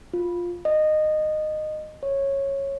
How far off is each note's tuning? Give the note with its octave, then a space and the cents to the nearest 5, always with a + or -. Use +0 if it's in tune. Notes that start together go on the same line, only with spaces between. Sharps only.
F4 +5
D#5 -15
C#5 -10